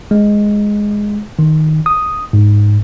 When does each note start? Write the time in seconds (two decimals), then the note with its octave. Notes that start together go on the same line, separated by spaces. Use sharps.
0.11 G#3
1.39 D#3
1.86 D#6
2.33 G#2